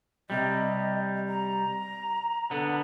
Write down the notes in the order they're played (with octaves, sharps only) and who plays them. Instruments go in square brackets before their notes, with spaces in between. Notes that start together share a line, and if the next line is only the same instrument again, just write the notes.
[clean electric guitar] C3 G3 [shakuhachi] D#5
[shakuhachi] A#5
[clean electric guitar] D3 B3